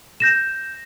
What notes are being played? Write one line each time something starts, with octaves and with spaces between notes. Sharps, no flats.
G6 A#6 E7